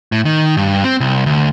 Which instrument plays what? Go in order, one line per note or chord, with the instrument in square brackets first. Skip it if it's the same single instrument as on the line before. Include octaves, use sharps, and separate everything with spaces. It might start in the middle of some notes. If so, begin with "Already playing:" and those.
[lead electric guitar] A2
D#3
G2
C4
C2
D2